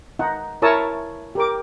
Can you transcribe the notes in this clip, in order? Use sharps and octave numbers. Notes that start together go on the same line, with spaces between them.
D#4 F#5
E4 A#4 C#5 A5 D#6 E6
G4 A#4 D6